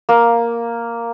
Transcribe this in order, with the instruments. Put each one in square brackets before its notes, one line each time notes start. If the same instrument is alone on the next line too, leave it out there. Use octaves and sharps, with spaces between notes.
[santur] A#3